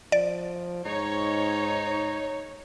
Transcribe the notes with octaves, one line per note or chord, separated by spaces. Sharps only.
F3 D5
G#2 D#4 C#5